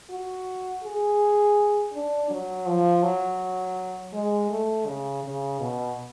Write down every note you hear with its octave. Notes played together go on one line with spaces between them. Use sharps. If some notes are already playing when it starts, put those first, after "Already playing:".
F#4
G#4
D4
F#3
F3
F#3
G#3
A3
C#3
C#3
B2